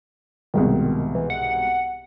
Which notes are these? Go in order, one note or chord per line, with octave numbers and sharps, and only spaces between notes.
C2 G#2 B2 D#3
E3
F#5